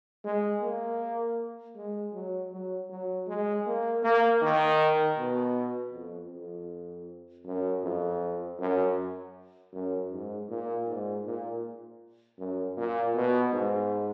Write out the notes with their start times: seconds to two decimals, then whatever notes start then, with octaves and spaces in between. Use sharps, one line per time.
0.25 G#3
0.61 A#3
1.76 G#3
2.13 F#3
2.52 F#3
2.90 F#3
3.27 G#3
3.66 A#3
4.03 A#3
4.42 D#3
5.17 B2
5.93 F2
6.31 F2
7.45 F#2
7.83 F2
8.59 F#2
9.73 F#2
10.11 G#2
10.49 A#2
10.88 G#2
11.26 A#2
12.39 F#2
12.77 A#2
13.15 B2
13.52 G#2